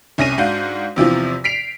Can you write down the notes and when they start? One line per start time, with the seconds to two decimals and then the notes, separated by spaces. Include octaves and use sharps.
0.18 C2 C#4 A#6 D#7
0.38 G#2 D4 F#4 F5 G6
0.96 E2 C3 E3 F3
1.44 B6 C7 D7 F7